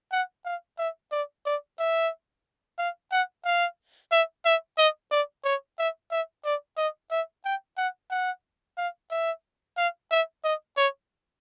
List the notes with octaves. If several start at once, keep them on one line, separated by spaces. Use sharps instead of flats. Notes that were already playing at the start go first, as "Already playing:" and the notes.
F#5
F5
E5
D5
D5
E5
F5
F#5
F5
E5
E5
D#5
D5
C#5
E5
E5
D5
D#5
E5
G5
F#5
F#5
F5
E5
F5
E5
D#5
C#5